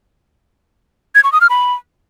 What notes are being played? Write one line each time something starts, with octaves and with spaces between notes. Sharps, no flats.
G#6
C#6
D#6
F6
B5